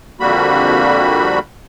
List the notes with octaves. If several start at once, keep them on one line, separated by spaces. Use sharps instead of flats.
F2 D3 G3 A#3 F#4 B5